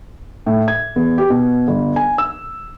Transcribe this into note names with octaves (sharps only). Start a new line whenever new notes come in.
A2
G#6
E2
G4
B2
G1
G#5
E6